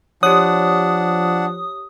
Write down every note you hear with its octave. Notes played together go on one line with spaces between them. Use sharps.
F3 D4 G4 C#5 F#5 D#6